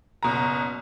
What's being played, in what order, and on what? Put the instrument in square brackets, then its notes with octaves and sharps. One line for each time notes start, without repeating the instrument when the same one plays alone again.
[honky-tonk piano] F#1 B2 A#5